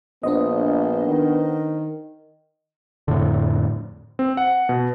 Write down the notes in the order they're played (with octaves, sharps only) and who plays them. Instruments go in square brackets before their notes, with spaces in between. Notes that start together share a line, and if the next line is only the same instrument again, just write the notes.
[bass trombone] A#1 [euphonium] B3 [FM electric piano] D4 C5 D#5
[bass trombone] D#3
[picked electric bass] F2 A2 D3
[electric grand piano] C4
F#5
B2